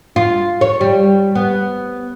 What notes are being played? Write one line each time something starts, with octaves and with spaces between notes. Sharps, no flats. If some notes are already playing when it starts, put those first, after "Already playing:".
F4
C#5
G3
B3